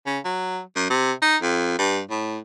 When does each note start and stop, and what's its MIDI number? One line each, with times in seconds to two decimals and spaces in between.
0.06 0.19 49
0.24 0.60 54
0.76 0.88 42
0.90 1.12 48
1.22 1.37 63
1.42 1.78 41
1.78 2.00 43
2.10 2.39 45